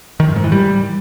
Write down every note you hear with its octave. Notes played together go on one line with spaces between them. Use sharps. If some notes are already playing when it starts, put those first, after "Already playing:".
D#3
F#2
G#2
E3
G3